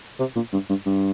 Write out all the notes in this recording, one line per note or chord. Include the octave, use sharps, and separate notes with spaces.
C3
A#2
G2
G2
G2